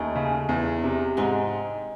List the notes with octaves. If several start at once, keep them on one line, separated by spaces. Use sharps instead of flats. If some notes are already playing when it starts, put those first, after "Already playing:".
Already playing: D#2 A3 C#4 D#4
C#3
E2
C3
G#2 G#3 C4